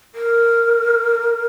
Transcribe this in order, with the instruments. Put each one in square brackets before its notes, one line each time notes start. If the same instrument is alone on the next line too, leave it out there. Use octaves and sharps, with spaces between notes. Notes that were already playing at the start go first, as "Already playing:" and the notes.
[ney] A#4